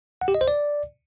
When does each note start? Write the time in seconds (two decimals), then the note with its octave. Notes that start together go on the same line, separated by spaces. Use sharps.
0.21 F#5
0.28 G4
0.35 D#5
0.41 C5
0.48 D5